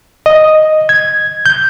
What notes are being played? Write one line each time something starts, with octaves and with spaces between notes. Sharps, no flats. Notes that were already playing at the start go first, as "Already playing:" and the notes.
D#5
G#6
G6